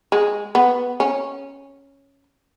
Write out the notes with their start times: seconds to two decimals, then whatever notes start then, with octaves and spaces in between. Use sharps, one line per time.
0.12 G#3
0.55 B3
1.00 C#4